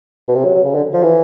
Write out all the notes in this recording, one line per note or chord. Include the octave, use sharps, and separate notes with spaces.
B2
C3
F#3
F#3
C#3
D3
F3
E3